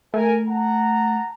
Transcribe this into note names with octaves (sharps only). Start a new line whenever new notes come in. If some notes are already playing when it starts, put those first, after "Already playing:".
A3 A#4 G#5
F#5 A5 A#5